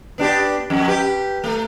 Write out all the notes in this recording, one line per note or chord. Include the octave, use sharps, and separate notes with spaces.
B3 D4 G4
F2
G4 B4
A3